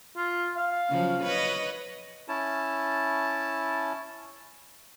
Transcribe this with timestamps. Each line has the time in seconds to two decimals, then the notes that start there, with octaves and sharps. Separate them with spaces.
0.16 F4
0.57 F5
0.89 C#3 F3 F#3
1.23 B4 C#5 D#5
2.28 C#4 E4 A5